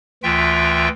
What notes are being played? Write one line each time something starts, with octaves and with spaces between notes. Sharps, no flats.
D2 E3 F4 E5 G5